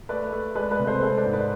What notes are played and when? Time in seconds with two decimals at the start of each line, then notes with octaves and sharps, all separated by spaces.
0.09 A3 B4 D5
0.32 A3
0.55 G#3 B4 D5
0.71 B4 D5
0.79 C3
0.87 A4 C5
1.02 G#3 A4 C5
1.17 B4 D5
1.26 G#2
1.33 B4 D5